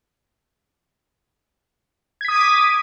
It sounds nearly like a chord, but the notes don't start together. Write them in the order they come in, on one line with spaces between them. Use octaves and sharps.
G#6 B6 D#6 D#7 D6